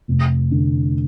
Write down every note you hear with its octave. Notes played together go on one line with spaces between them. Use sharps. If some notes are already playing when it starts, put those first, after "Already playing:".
F1
D3